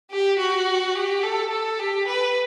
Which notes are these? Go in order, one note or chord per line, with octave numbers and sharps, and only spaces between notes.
G4
F#4
G4
A4
A4
G4
B4